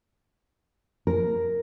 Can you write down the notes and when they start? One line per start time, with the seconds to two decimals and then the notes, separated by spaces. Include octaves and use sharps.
1.07 A#4